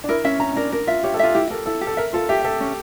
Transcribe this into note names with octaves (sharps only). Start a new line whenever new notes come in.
D4
E4 A#4
C#4 E5
C#4 A#5
C#4
D4 A#4
D4 A#4
F4 E5
G4 C#5
A4
F4 E5
E4 G4
A4 A#4
E4 A4
G4
A4
A#4 E5
F4 A4
G4 E5
A4 E5
C#4